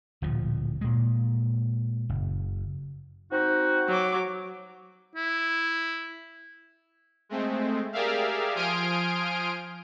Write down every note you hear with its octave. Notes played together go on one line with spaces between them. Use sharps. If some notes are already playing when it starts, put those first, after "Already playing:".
D1 A#2 F3
A#2 G#3
F#1
C4 D#4 F#4
F#3 D6
E4
G#3 A3 C4
G4 G#4 A#4 D5 E5 F5
F3 G#5 C6 D#6 F6 D7